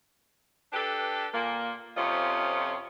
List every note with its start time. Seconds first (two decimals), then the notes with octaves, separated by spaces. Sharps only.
0.73 D4 G4 A4 B4
1.33 A#2 A#3
1.95 F2 C3 C#4 F4 D#5